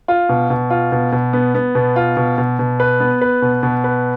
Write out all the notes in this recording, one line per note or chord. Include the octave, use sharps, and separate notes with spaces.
F4
B2
B2
F4
B2
B2
B3
B3
B2
F4
B2
B2
B2
B4
B3
B4
B2
B2
B4